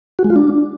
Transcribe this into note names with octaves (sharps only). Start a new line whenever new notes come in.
F#4
G#3
F4
D4